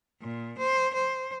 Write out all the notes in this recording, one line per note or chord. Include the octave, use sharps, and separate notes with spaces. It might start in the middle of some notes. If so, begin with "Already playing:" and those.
A#2
C5
C5